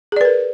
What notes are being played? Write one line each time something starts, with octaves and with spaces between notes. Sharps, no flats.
G#4 A#4 B4 D5